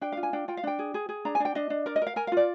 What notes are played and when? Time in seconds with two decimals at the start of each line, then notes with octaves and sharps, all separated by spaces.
0.01 D4 G5
0.12 F4 F5
0.23 G#5
0.33 D4 G5
0.48 F4 G5
0.57 F5
0.63 D4 G5
0.79 G#4
0.94 G#4
1.09 G#4
1.25 D4 A#5
1.35 G#5
1.40 D4 G5
1.55 D4 D#5
1.70 D4
1.86 A#4 D5
1.96 D#5
2.02 A#4
2.07 F5
2.16 A#4 G#5
2.27 F5
2.32 F4 D5